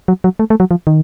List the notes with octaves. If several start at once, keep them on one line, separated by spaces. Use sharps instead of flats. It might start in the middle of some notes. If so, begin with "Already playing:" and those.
F#3
F#3
A3
A3
F#3
F3
D#3